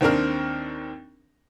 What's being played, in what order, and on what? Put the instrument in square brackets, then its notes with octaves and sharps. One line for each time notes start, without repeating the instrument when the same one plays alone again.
[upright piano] D#2 C4 D4 A#4 F6